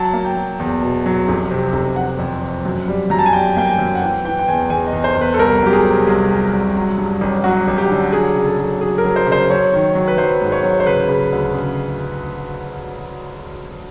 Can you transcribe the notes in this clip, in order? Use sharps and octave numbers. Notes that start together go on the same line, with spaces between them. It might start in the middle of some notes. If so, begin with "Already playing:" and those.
Already playing: F#3 A5
A#3
G5
F#3
E2
B2
F#3
F1
C3
F1
F1 F#5
F2
F2
F#2
G3
F#2 A#5
A5
G#5
G3 G5
A#3 G5
G#5
F#2
F#5
E3 G5
E3 G5
G5
E2 G#5
E2 G#5
D#5
E2
C5
E2
B4
A4
C2 A#4
F#3 G4
G#4
C3
C2 G#4
F#3
C2
F#3
G2
A1
F#3 F#4
A1
G4
D3
F#3 G#4
C#3
A4
F#3
F#3 G#4
A#4
F#3
C5
C#3
C5
F#3 C#5
D#3
F#3
B4
F#3 C5
G#2
C#5
F#3
C5
C#3 B4
C#3
D2
C#3